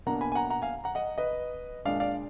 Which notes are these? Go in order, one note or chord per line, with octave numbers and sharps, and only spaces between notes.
B2 A#3 D4 F#5 A#5
G#5 B5
G#5
F#5 A#5
F#5 A#5
F5 G#5
F#5 A#5
D#5 F#5
B4 D#5
A#2 G#3 D4 D5 F5
D5 F5